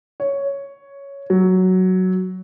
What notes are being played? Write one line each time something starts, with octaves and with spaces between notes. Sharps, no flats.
C#5
F#3